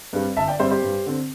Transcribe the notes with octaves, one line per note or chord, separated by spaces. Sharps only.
G2 G3 C4
G1 E5 A5
D5 G5
G2 G3 C4 C5 E5
G4 C5
G2
D3 C4